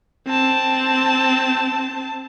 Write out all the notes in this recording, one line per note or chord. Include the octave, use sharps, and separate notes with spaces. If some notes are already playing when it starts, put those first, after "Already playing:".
C4 A5